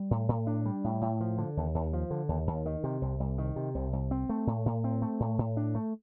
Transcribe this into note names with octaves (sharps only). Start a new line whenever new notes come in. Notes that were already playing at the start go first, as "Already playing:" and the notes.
Already playing: G3
A2
A2
D4
G3
A2
A2
F3
D3
D#2
D#2
F3
D3
D#2
D#2
D#3
C3
C2
C2
D#3
C3
C2
C2
C4
A3
A2
A2
C4
A3
A2
A2
D4
A3